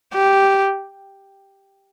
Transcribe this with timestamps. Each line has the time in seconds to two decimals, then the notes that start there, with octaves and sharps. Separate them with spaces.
0.13 G4